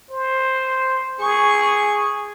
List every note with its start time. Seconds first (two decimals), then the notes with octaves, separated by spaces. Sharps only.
0.11 C5
1.20 G#4 C#6